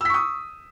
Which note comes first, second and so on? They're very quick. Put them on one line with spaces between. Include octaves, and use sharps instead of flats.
E6 B6 C#6 D#6